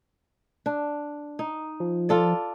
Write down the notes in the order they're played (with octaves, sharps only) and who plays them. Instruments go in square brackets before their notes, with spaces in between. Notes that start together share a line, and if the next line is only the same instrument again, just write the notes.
[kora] D4
D#4
[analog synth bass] F3
[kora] F4 A4 D5